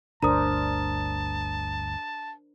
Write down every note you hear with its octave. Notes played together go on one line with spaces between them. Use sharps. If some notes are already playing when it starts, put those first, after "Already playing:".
G1 D2 D4 A#4 C5 A5 A#5 D#6